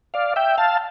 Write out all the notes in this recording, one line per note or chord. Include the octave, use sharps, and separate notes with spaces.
D5 F5
E5 G5
F5 A5